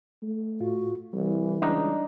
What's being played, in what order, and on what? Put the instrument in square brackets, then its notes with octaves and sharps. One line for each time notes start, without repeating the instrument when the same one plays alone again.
[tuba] A3
[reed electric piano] A2 F4 [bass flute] F#4
[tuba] C2 [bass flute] E3 [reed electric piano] G3
[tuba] C#2 [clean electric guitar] D4 D#4